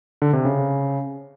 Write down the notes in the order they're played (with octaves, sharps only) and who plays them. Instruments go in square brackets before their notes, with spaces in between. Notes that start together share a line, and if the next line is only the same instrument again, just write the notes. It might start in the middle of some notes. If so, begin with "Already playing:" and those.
[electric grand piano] D3
C3
C#3